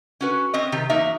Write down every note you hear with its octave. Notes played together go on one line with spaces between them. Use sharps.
C#4 F#4 B4
C4 C#4 D#5
C3 D#3 G4
E2 F#3 A#3 D#4 E5